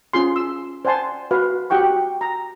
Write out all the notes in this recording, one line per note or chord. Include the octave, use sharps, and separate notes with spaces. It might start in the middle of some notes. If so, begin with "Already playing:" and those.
C#4 F4 G#4 C6
E6
C5 D5 F#5 G#5 A5 C6
F#4 B4 F5
F#4 G4 F#5 G5 C#6
A#5